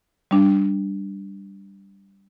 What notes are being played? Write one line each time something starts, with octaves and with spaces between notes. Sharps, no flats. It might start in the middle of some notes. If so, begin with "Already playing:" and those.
G3 D4